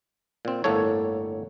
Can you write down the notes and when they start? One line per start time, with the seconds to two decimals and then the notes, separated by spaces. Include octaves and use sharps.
0.45 A#2 C4
0.64 G1 A2 A#3 A4 C#5